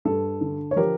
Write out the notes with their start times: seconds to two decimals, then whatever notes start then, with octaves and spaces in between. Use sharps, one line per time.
0.05 G2 A4
0.41 D3
0.71 C#5
0.76 F3 G4 A#4